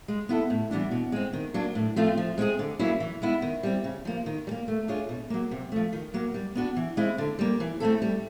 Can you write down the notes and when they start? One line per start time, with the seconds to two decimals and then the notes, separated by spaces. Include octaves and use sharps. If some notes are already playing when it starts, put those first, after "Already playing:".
0.08 G#3
0.29 B3 E4 A4
0.50 A2
0.71 E3 G3 B3 D4
0.91 B2
1.12 G#3 C4
1.33 D#3
1.54 F#3 A#3 D4
1.75 A2
1.96 F3 A3 C4 F4
2.18 F3
2.38 G#3 C4 F4 G#4
2.59 D3
2.79 F#3 A#3 C#4 E4
3.00 E3
3.22 G#3 B3 E4
3.42 D#3
3.63 G3 C4
3.84 C#3
4.05 F3 A#3
4.26 D#3
4.47 G3
4.51 A#3
4.68 A3
4.88 D4 F4 G#4 C#5
5.09 B2
5.30 F#3 A#3
5.51 C3
5.72 F3 A3
5.93 D#3
6.14 F#3 A#3
6.34 G3
6.55 B3 D4 F#4
6.76 E3
6.97 G#3 C4 E4
7.18 D3
7.39 G3 A#3
7.60 E3
7.80 A3 C4 E4 A4
8.02 G3